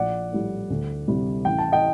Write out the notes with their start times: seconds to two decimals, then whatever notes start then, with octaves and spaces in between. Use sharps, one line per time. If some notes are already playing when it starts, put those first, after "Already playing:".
Already playing: A#1 D5 F#5
0.32 A2 G3
0.70 D2
1.08 C3 G3
1.45 A1 G5
1.58 A5
1.72 D#5 G5